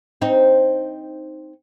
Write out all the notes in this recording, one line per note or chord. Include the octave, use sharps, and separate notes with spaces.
C4 D#4